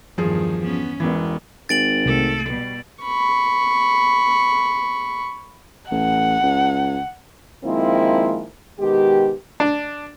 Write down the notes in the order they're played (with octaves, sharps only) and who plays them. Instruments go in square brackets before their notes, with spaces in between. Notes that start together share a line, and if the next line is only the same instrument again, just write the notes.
[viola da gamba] E2 G2 D#3 [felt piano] F3 G#4
[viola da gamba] B3 C#4
[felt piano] E1 E3 [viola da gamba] B3
[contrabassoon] G#1 [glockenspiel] A6 D7 F#7
[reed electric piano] C2 [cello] A3 A4
[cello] B2 G3
[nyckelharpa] B5 C#6
[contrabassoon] A1 [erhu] F#5
[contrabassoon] C#2
[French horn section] D#3 F3 G#3 A#3 C4 E4
B2 D#3 G#3 G4
[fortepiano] D4